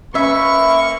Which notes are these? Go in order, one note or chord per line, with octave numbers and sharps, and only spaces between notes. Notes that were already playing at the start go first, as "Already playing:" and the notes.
A#3 C#4 B4 E5 C#6